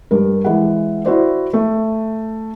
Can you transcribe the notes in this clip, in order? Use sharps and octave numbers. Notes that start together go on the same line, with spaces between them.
G2 A#4
E3 G#3 F#5
E4 F#4 C5 D5
A3